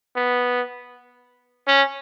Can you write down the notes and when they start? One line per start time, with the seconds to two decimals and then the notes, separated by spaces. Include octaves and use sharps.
0.16 B3
1.67 C#4